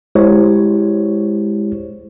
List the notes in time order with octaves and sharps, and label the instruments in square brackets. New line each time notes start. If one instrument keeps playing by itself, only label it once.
[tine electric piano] G#3 E4 G4 C5 C#5